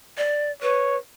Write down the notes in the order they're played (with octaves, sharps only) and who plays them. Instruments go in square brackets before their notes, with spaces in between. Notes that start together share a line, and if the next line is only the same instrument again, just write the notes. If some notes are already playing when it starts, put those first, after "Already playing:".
[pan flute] D5
[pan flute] B4 [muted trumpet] C#5